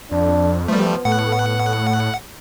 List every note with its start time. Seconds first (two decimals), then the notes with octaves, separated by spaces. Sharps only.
0.11 F2 D4
0.68 F3 G3 A3 B3
1.05 A2 F#5